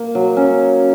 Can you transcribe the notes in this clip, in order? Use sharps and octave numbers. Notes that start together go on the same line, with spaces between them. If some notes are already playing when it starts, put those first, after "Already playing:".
Already playing: A#3
F#3
C#4